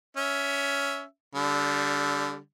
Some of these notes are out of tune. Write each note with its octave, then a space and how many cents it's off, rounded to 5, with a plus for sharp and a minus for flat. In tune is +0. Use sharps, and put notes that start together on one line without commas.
C#4 +15 E5 +0
D3 -25 G3 +0